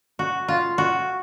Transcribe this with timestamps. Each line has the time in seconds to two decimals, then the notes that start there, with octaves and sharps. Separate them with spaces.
0.19 F#4
0.48 F4
0.78 F#4